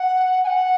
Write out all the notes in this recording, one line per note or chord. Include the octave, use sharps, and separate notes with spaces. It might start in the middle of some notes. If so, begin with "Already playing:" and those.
Already playing: F#5
G#5
F#5